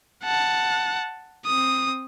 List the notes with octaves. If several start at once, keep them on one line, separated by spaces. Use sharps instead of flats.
F#5 A5
C4 D#6